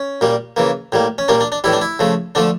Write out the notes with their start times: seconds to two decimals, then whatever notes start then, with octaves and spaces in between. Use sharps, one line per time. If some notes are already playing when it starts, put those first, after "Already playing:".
Already playing: C#4
0.21 A#2 G3 A#3
0.57 C#3 E3 A#3
0.92 A2 G3 A#3
1.18 C#4
1.28 A#2 G3 A#3 D4
1.41 D4
1.52 D4
1.64 A2 E3 G3 E4
1.73 D4
1.82 E4
1.99 C#3 F3 A3
2.35 D3 F3 A3 D4